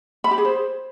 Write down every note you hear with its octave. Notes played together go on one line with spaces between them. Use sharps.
B5
G4
G#4
C5